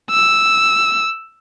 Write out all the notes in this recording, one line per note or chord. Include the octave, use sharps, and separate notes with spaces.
E6